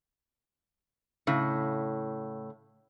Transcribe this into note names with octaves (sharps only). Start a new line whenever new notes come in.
A2 C#3